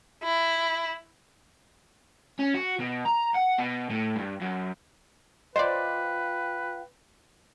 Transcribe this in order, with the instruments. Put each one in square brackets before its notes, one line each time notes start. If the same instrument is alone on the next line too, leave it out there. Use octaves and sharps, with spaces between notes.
[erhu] E4
[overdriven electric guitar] C#4
F#4
B2
A#5
F#5
B2
A2
G2
F#2
[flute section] F4 F5 G5 [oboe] B4 [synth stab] C5 D5 [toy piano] D#5